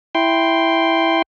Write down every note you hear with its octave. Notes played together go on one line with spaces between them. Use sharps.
E4 G5 C6